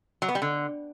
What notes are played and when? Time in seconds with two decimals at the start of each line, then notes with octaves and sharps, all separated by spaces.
0.22 F#3
0.29 B3
0.35 G3
0.42 D3